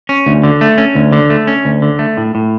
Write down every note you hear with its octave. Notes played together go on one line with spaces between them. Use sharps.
C#4
D2
D3
A3
C#4
D2
D3
A3
C#4
D2
D3
A3
A2
A2